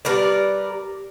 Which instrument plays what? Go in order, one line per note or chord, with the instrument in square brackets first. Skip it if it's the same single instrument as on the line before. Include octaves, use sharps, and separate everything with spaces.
[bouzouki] G3 A#4 B4 D5